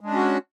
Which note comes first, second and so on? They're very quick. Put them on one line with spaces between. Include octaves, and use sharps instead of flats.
G#3 D4 C#4 F#4